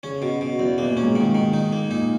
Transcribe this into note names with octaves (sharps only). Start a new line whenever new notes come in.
C#3 C#4
B2
B2
E2
B2 A#3
A#2
C#4
G#2
G#2 D#3
D#3
D#4
A#3
A#2 D#4